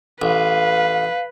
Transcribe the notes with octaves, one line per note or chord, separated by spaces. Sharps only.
A1 B4 F5